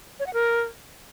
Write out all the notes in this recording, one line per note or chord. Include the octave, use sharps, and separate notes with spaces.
C#5
F#5
A#4